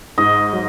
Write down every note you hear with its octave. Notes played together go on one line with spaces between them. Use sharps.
G#2 D#5
F#3